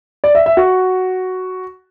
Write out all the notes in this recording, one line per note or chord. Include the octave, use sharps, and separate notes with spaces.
D5
E5
E5
F#4